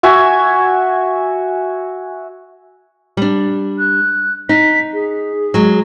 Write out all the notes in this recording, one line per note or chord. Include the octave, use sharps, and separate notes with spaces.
F#4 E5 G#5
G3 D4
F#6
D#4 B6
G#4
F#3 G#3